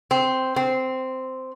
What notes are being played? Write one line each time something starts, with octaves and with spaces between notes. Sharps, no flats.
C4
C4